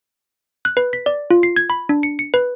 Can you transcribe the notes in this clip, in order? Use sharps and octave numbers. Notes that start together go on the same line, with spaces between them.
F#6
B4
B6
D5
F4
C7
G#6
B5
D4
C#7
C#7
B4